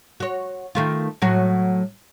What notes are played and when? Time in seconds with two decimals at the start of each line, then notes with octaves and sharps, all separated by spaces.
0.20 F#4 C#5
0.75 D#3 A3 F4
1.22 A2 F#3 F#4